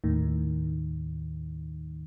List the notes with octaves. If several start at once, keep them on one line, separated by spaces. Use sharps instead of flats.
D#2 A2 D#3